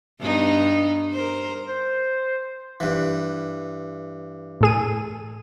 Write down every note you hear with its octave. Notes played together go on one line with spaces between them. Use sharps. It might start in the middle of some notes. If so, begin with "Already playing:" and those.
G2 B3 D#4
A#4 C5
C5
G2 E3
A2 G#4 D#7